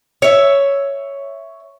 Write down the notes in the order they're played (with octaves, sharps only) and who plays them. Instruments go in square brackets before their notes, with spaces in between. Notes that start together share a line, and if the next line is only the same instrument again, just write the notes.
[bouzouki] C#5 E5